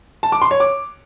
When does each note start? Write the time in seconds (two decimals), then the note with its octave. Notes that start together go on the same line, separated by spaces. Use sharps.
0.23 A5
0.32 D6
0.42 C6
0.51 C#5
0.60 D6